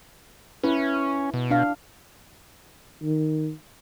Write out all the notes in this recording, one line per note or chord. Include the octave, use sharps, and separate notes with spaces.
C#4 E4 B4
B2
D4 F5
D#3